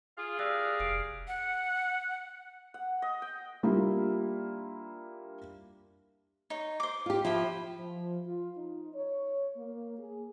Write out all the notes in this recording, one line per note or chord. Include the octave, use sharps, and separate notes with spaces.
F4 G#4
G3 A#4 D5 F5 E6 F#6
F1 F6 C7 D7
F#5
F#5
D#5
G5
G3 A#3 D4 E4 F4
D#4 C#5
C5 D6
F4 G4
F3 E4 G5 B5
F3
F4
D#4
C#5
A#3
G#4